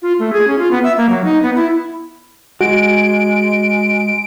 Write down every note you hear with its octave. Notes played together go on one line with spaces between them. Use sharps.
F4
A3
G#4
C#4
F4
B3
E5
A#3
F#3
D#4
B3
E4
G#3 F#4 D7